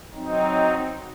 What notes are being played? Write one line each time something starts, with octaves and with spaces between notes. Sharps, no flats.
F#3 C4 D#4